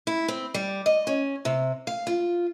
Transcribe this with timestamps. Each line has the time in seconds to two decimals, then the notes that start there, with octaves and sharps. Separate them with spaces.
0.07 E4
0.28 C4
0.54 G3
0.86 D#5
1.07 C#4
1.45 C3
1.87 F5
2.07 F4